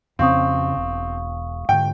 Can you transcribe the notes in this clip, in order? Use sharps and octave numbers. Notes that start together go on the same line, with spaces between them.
F2 C#3 C4 C#4 F5 C#6 D#6
E1
G#2 D3 G5